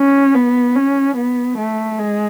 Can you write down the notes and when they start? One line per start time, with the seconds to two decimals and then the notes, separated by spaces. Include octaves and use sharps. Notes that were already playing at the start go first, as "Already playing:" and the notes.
Already playing: C#4
0.35 B3
0.76 C#4
1.17 B3
1.58 A3
1.99 G#3